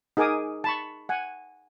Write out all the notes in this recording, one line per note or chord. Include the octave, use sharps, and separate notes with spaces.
D#4 G#4 A#4 G#5 D6 D#6
A5 B5 C#6
F#5 G#5